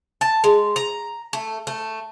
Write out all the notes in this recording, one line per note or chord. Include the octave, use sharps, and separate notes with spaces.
A5
G#3
A#5
A3
A3